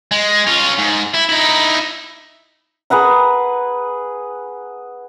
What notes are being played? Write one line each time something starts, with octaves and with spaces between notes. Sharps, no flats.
G#3
C#4 F4
G#2
E4
D#4 E4
G#4 B4 F#5 A#5